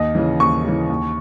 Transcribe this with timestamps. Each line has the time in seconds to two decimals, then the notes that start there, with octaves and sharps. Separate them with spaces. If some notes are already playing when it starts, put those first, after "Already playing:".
Already playing: D#2 D#5
0.15 C#3 E3
0.40 D#2 C#6
0.64 C#3 E3
0.89 D#2